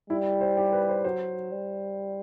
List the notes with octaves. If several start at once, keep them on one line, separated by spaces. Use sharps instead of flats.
G3 E4
C5
G4
B4
C5
F#3 C5
G3